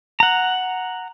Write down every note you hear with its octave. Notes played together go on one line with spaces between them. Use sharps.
F#5 A#5